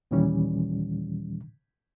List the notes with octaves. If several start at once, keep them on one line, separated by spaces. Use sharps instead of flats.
D#2 A#2 D#3 E3 G3 C#4